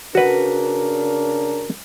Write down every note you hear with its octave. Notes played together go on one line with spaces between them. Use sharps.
C#3 D4 F#4 A#4 B4